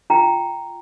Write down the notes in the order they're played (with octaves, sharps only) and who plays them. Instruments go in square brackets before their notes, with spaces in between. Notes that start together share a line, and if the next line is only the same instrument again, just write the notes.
[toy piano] F4 G5 A#5